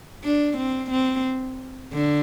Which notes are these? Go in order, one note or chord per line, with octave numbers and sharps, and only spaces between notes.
D4
C4
C4
D3